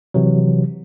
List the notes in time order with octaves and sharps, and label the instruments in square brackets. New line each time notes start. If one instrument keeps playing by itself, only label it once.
[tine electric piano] C3 E3 F#3